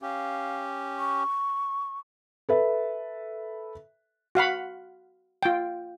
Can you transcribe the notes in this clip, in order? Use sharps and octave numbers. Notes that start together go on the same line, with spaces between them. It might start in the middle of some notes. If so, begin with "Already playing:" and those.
C#4 G4 F5
C#6
A4 B4 E5
F#4 F5 F#5 B5
F4 G5